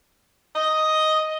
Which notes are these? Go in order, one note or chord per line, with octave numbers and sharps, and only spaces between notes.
D#5